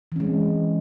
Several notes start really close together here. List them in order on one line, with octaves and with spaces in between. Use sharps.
E3 C#4 G#3 C4